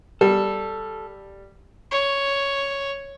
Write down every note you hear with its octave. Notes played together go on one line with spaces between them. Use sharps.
G3 A4
C#5